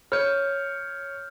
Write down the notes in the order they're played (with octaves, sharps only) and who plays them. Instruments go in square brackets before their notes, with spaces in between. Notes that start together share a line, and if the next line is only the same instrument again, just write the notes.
[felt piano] C#5 [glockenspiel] F6 G6